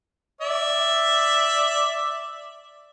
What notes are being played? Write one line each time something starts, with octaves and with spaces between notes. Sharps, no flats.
D5 E5